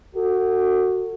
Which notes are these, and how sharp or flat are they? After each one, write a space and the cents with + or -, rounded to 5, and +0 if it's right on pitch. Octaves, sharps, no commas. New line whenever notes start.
F#4 +0 A4 +35